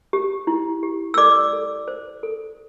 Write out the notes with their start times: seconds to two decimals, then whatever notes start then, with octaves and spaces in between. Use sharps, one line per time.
0.13 G4
0.47 E4
0.83 G4
1.14 E6
1.18 A4 D5 D6
1.53 A4
1.88 C5
2.23 A4